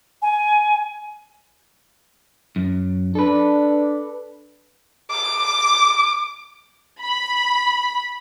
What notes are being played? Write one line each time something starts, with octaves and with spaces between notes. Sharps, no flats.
G#5
F#2
D4 A4 B4
D6
B5